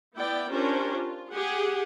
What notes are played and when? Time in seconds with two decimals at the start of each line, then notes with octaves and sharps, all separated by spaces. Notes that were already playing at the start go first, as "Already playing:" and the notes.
0.15 B3 E4 D5 G5
0.49 C#4 D4 F4 G4 A#4 C5
0.90 F4
1.30 G4 G#4 F#5